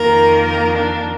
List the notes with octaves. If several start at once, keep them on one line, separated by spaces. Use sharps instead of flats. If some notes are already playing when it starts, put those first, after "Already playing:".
Already playing: F2 D#3 A#3 A#4
A#4
D4